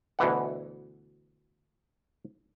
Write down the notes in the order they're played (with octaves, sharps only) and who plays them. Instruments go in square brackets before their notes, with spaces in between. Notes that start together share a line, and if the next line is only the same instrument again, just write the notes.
[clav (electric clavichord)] D2 B2 E3 F#5